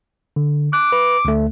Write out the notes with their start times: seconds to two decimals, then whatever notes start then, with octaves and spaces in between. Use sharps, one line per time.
0.36 D3
0.73 D6 F#6
0.92 B4
1.25 D2 A3